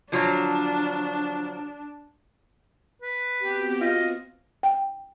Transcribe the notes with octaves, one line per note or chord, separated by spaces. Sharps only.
D3 F3 F#3 D4
B4
B3 C4 F#4 G4
F4 D#5
G5